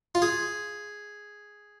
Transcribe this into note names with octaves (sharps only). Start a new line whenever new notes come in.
F4
G#4